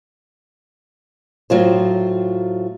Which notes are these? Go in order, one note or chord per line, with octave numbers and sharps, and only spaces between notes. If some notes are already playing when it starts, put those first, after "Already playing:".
A2 F#3 F4 C5